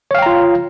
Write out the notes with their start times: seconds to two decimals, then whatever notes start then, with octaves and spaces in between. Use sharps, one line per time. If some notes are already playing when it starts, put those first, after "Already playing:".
0.11 C#5
0.15 F5
0.18 G5
0.22 A#5
0.26 F4